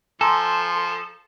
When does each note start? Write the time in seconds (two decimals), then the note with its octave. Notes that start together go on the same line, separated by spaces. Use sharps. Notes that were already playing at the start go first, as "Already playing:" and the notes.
0.21 F3 A4 G#5 A#5 C6